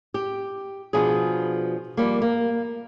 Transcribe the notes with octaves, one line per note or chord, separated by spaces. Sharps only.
G4
B2 F3 D4 G#4
F3 G3 A#3
A#3